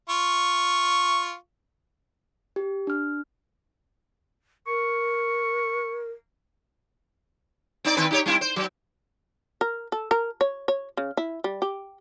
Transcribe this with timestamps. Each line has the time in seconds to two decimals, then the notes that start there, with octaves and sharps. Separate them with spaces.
0.09 F4 C#6
2.56 G4
2.87 D4 F6
4.67 A#4 C#6
7.85 C4 D#4 D5
7.97 D#3 C4 B4
8.11 D#4 G4 C#5
8.26 G3 C4 E4
8.41 C5
8.56 F#3
9.61 A#4
9.92 A4
10.11 A#4
10.41 C#5
10.68 C#5
10.97 C#3
11.17 E4
11.44 G3
11.62 G4